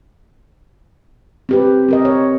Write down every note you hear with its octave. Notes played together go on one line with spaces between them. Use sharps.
C4 G4 B4
C4 A#4 D#5
C#5